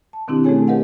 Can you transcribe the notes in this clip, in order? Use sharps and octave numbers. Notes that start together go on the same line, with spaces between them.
A5
B2 D#3 C4 D4 E4 G4
A3 C#4 G#4 A4 C#5 G#5
G4 A#4 B4 D#5 F5 F#5